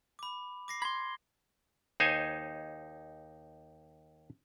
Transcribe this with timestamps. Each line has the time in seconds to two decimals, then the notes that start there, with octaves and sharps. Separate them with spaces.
0.19 B5 D6
0.68 D6 A#6 C7
0.82 B5 C6 G#6
2.00 D#2 D#4 C5 C#5 G#5